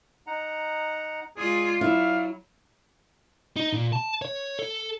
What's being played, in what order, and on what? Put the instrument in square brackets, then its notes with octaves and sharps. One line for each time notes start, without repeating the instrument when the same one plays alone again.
[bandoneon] D#4 F#5 A#5
[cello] G#3 F4 [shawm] G#4 [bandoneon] D5
[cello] F#3 [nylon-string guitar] E4 [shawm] F5
[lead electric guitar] D#4
A#2
A5
C#5
A4